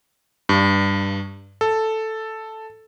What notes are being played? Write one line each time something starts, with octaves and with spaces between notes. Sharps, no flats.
G2
A4